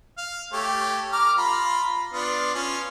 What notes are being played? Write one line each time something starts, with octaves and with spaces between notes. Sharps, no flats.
F5
A3 G4 C#5
A#5 D6 F6
F4 A#5 B5
B3 D4 F4
C#4 F4